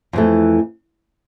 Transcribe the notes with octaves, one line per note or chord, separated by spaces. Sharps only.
F2 E3 A3